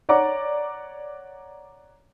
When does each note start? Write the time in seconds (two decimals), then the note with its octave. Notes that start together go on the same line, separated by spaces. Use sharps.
0.09 C#5 D5 F#5 A#5 D6